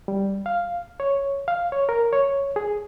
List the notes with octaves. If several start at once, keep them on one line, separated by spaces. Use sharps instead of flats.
G3
F5
C#5
F5
C#5
A#4
C#5
G#4